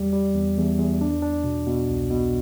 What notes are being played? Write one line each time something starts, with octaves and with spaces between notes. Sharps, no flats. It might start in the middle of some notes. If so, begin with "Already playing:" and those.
Already playing: E2 G3
G3
E2
E2
E2
D4
D4
B2
B2
C2
B2